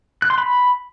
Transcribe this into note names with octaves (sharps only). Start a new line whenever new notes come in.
F#6
C6
B5